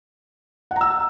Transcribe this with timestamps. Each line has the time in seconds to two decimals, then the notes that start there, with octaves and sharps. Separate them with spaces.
0.71 F#5
0.76 A#5
0.81 E6